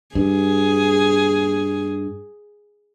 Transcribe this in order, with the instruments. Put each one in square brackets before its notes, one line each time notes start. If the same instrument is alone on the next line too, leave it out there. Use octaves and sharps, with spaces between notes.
[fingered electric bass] G2 [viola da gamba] G#4